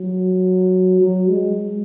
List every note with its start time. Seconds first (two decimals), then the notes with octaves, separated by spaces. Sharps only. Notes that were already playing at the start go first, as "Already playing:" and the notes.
Already playing: F#3
1.01 F#3
1.29 G#3